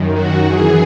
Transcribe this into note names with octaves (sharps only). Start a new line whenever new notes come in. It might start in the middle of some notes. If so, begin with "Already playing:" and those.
Already playing: F#2 D#3
F#4
F#2 E3 G#4